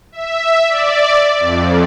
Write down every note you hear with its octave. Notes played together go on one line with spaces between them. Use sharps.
E5
D5
F2